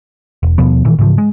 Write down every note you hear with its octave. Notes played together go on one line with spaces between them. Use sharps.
E1
D#2 B2 F3 B3
A#2 D#3 E3
G#2 C#3 E3 F3
G#3